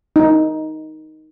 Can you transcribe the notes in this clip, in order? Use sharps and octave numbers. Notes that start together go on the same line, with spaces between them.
D#4